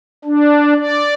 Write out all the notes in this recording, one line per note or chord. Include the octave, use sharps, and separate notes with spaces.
D4
D5